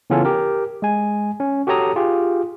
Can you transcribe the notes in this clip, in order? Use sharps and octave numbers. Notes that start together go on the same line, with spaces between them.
C#3 E3 B3 C#4 F4 A4
G4 A#4
G#3 G#5
C#4
F#4 G4 A4 C#5 A#5 D#6
F4 G4 G#4